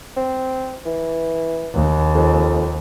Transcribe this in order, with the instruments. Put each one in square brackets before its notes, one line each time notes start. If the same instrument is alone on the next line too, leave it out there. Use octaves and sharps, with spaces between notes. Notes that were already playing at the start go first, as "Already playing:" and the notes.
[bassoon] C4
E3
[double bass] D#2
[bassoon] F2